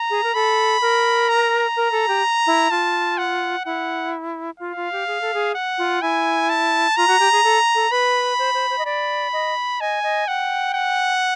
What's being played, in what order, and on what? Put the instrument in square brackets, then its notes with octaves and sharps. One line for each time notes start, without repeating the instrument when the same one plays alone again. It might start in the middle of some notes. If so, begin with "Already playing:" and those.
Already playing: [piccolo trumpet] A#5
[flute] G#4
A#4
[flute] A4 [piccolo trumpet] B5
[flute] A#4
[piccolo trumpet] A#5
[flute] A#4
A4
G4
E4
[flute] F4 [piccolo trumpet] A5
[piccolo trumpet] F#5
[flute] E4 [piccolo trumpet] F#5
[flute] F4 [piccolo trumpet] F5
[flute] F4
G4
G#4
A4
G#4
[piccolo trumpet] F#5
[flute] F4
[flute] E4 [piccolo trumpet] G#5
[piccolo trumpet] A5
[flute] F4 [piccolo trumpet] A#5
[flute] F#4
G4
G#4
A4
A4
[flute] B4 [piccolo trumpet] B5
[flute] C5
C5
C5
D#5
[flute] D5 [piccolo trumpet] B5
[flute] D#5
[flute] D#5 [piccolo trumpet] G#5
[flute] D#5
[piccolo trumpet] F#5 [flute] G5
[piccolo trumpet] F#5